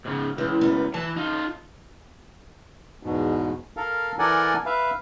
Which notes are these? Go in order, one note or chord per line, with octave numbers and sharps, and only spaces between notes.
G#2 C#3
C#2 E3
F#2 B3
E3 A5
D#4 F4
E2 G#2 B2
A4 A#4 F5
E3 A4 A#4 D5 F#5 G#5
B4 E5 F5